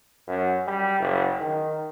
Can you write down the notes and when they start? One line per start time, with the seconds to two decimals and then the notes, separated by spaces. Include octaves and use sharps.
0.27 F#2
0.67 G3
0.99 F#1
1.41 D#3